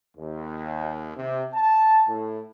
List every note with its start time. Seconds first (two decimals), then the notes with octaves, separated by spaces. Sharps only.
0.16 D#2
1.17 C3
1.54 A5
2.08 A2